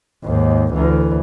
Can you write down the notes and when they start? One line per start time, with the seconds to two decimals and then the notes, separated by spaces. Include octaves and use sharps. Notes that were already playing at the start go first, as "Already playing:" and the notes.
0.25 D#2 G#2
0.74 D2 E3